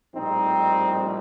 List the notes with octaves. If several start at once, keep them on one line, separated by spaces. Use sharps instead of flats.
A#1 A2 G3 C4 D#4